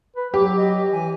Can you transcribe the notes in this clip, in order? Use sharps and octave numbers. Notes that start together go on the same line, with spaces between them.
B4
F#3 G4 D6
D#5
E3 G#5